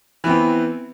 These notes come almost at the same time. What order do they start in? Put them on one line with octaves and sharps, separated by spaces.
E3 B3 C4